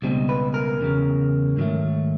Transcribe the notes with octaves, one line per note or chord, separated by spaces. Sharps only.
C#2 B2 G3 C4 D#4
B4
A#4
E2 C#3 F#3
G#2 D#3 F#3 A3